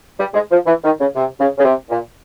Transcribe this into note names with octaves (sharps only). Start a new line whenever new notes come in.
G3
G#3
F3
E3
D#3
C#3
C3
C#3
C#3
C3
A#2